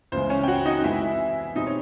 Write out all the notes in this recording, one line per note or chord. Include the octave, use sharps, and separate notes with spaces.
C#2 C#3 E3 G#3 C5
C#4 C#5
G5
F#4 F#5
D#4 D#5
E2 C3 E3 G#3 E4 E5
B2 G3 C4 D#4 D#5
C#5